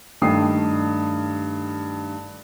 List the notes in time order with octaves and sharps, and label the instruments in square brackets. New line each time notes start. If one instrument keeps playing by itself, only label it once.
[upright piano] G2 D#3 A3 G5 D#6 C7